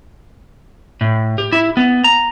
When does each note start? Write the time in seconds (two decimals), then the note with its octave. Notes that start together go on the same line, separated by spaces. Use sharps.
1.01 A2
1.38 G4
1.52 E4
1.77 B3
2.04 A#5